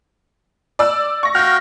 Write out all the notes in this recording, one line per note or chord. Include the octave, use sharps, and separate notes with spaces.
D5 E6
C#6 A#6
F#4 F5 G5 F6 A#6